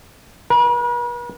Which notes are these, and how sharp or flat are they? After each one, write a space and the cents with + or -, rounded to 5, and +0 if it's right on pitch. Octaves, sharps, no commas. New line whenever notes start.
B4 -45